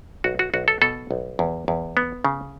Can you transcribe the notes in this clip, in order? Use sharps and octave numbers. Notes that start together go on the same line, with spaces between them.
B1 F#4
F#4
B1 F#4
A4
B2 A4
B1
E2
E2
B3
C#3